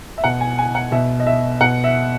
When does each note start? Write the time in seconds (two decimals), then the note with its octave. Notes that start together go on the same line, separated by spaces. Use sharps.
0.18 E5
0.24 B2 F#5
0.41 G#5
0.58 G#5
0.75 F#5
0.92 B2 E5
1.20 D#5
1.27 E5
1.61 B2 F#5
1.84 E5